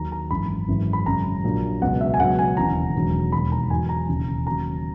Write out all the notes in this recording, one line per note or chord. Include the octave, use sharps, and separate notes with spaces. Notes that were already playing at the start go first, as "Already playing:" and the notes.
Already playing: D#2 D#3 F#3 A#5
A#5
G#1 F#2 E3 B5
G#1 F#2 E3
B5
G#1 F#2 C#3 F#3 A#5
A#1 A#2 F#3
C#2 B2 F#3 F#5
E5
G#5
C#2 B2 F#3 F#5
G#5
E1 D#2 C#3 E3 A#5
E1 E2 D#3 F#3
E1 D#2 D#3 F#3 B5
A#5
E2 D#3 F#3 G#5
A#5
E1 D#2 C#3 E3
D#2 C#3 F#3 A#5